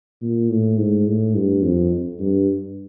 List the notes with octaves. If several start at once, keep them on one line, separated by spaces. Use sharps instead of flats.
A#2
A2
G#2
A2
G2
F2
G2